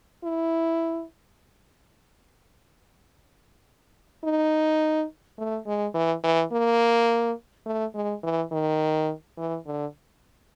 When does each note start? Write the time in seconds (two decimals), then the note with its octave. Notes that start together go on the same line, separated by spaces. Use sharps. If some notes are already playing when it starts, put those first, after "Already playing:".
0.24 E4
4.24 D#4
5.38 A3
5.67 G#3
5.94 E3
6.24 E3
6.52 A#3
7.66 A3
7.95 G#3
8.23 E3
8.52 D#3
9.38 E3
9.66 D3